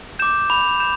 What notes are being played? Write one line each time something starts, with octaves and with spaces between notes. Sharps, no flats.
D6 G6 E7
B5 F7
G6 E7